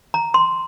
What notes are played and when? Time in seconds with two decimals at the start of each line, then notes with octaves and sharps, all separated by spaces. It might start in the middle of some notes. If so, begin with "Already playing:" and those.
0.14 A#5
0.34 C6